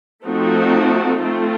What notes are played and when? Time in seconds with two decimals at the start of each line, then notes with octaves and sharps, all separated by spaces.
0.25 F3 A3 C4 D#4 F#4
1.20 A3 C4 F4